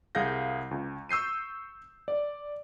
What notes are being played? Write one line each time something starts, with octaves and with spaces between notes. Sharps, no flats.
C2 G#4 F5 G6 A#6
C#2
C#6 E6 G6 C7 D#7
D5